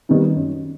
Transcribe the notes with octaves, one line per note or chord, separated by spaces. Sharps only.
D#3 G3 B3 D#4
F#2